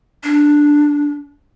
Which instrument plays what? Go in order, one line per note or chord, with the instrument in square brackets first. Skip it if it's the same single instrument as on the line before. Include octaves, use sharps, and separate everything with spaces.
[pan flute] D4